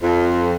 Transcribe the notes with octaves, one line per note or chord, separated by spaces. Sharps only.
F2